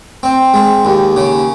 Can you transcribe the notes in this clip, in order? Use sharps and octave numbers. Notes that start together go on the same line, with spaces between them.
C4
G#3
D#2
C#3